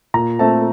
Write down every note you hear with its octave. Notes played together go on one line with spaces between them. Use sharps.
A#2 A#5
A3 C4 A5